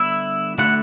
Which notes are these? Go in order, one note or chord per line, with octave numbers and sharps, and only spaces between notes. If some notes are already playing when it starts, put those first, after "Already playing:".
Already playing: D3 G3 B3 D4 E4 E5
D3 A3 E4 F#4 F#5